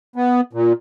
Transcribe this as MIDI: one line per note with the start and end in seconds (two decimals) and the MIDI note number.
0.16 0.41 59
0.53 0.73 46